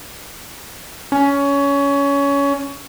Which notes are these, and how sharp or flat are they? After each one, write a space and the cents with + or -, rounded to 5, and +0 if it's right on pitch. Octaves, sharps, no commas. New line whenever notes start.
C#4 +20